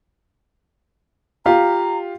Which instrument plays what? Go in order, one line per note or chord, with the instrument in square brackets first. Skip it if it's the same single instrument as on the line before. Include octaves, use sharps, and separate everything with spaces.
[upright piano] F4 G4 F5 [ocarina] A#5